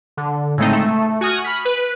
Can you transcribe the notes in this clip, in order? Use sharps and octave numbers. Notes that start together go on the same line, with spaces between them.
D3
A2 C#3 G#3 A3 C4 D#4
A3
F#4 G#5 C#6 D#6 F6 F#6
B5 F6 B6
B4